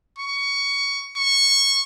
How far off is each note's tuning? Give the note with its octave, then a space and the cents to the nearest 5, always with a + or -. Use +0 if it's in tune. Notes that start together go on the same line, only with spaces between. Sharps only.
C#6 +15
C#6 -10